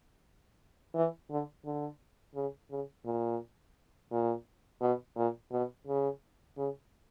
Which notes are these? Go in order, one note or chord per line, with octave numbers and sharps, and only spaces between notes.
E3
D3
D3
C#3
C#3
A#2
A#2
B2
A#2
B2
C#3
C#3